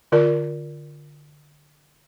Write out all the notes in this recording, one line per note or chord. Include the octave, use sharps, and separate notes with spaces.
D3 F4 A#4 D5